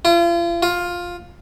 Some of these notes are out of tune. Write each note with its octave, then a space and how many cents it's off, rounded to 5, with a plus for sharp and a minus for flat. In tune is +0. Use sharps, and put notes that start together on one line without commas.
F4 -40
F4 +10